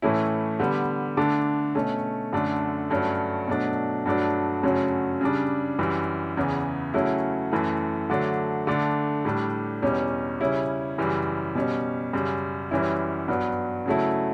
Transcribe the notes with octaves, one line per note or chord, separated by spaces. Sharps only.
A2 E3 A3 C#4 E4
D3 G3 B3
D3 A3 D4
B2 A3 C#4
F#2 D3 A3 D4
G2 F#3 A3 C#4
B2 F#3 A3 D4
G2 F#3 A3 D4
F#2 C#3 F#3 A3 C#4
C#3 G3 D4
F#2 E3 G3
E2 C#3 E3 B3
C#3 F#3 A3 C#4 E4
F#2 E3 A3
D3 F#3 A3 D4
D3 A3 D4
A2 G3 D4
E2 B2 G3 C#4
C#3 G3 C#4 E4
F#2 C#3 E3 G3
B2 G3 C#4
F#2 C#3 G3
F#2 E3 G3 C#4 E4
G2 F#3 B3
C#3 F#3 A3 E4